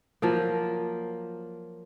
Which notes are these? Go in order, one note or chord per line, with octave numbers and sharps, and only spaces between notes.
F3 F#3 A#3